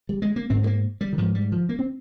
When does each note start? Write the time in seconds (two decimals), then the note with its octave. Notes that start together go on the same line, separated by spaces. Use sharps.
0.09 G3
0.22 G#3
0.36 A#3
0.50 G#2 C4
0.63 G#3
0.67 A#3
1.01 G3
1.13 D#3
1.18 G#2 F3
1.35 G3
1.52 F3
1.69 A#3
1.79 C4